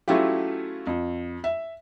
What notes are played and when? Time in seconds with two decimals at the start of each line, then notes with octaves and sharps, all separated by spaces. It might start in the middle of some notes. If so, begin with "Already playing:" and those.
0.08 F#3 A3 C#4 E4 F4 G4
0.87 F2
1.44 E5